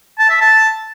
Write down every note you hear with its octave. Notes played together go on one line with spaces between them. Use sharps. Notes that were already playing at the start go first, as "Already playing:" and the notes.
A5
E5
A5